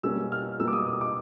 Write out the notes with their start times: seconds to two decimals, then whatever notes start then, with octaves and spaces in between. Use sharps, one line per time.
0.03 B2 G3 A#3 C#4 E6
0.32 F6
0.60 B2 G3 A#3 C#4 E6
0.68 D6
0.73 D#6
0.86 D#6
1.01 D6